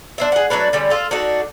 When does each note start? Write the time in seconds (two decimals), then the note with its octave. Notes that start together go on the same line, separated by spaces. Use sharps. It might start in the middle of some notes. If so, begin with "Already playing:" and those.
0.18 D4 C5 E5
0.32 G#4 F#5
0.50 F#3 A3 D4 B4
0.73 D3 G3 C#4
0.90 F4 A4
1.11 D4 D#4 F#4 A4